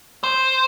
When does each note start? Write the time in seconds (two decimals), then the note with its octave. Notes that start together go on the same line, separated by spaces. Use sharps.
0.24 C5